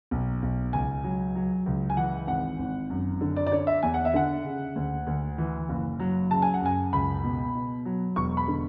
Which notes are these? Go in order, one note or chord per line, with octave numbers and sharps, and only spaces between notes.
B1
B1
C#2 G#5
F#3
F#3
C#2
G#5
E3 F#5
G#1 F#5
G#1
F#2
D3
D5
D5
D3 C#5
E5
E2 G#5
F#5
E5
D3 F#5
C#3
D2
D2
E3
F#1
F#3
C#3 A5
G#5
F#5
F#2 G#5
C#2 B5
B2
B2
F#3
E1 C#6
B5
D3